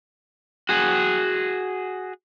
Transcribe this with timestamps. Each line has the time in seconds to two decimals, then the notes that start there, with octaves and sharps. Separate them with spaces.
0.69 F#4 G#4